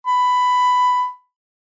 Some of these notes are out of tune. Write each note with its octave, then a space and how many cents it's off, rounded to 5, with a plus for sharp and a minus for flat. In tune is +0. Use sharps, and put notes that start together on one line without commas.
B5 +10